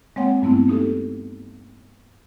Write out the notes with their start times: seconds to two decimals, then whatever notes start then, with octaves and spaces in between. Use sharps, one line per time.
0.16 G#3 A#3 C4 C#5 F#5 G5
0.42 G2 G3 A3 B3 C4 E4
0.68 A#3 D#4 G4 A4